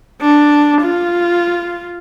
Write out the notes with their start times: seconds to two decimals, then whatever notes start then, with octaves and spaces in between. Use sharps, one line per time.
0.21 D4
0.81 F4